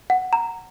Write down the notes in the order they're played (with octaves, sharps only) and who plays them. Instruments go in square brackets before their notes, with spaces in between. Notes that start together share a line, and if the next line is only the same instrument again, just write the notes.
[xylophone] F#5
A#5